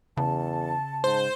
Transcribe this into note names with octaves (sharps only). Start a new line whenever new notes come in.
E2 C#3 A5
G#2 C5